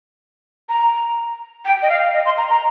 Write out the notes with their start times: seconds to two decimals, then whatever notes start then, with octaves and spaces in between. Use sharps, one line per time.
0.69 A#5
1.65 G5
1.82 D#5
1.89 F5
2.14 D#5
2.25 C6
2.38 A#5
2.50 A#5